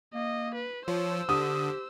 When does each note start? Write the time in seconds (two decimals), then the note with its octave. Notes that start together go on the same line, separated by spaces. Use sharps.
0.14 A#3 D#5
0.55 B4
0.88 F3 C5 C#5 E6
1.29 D3 G4 D#6